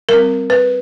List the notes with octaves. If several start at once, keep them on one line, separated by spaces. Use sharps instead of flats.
G3 C4 A#4
B4